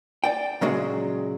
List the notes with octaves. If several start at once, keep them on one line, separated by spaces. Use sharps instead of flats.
D5 G5
A#2 C#3 F#3 G#3